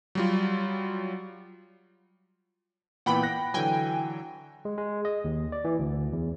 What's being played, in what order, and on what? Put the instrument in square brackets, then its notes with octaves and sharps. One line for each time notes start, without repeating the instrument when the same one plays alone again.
[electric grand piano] F#3 G3 F4
[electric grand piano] A#2 E3 B3 [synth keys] F#5 G5 B5
[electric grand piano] F#6 A#6
[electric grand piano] D3 E3 F#3 [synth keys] G5 G#5
[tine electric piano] G#3
G#3
D#5
D#2
D5
E3
D2
E2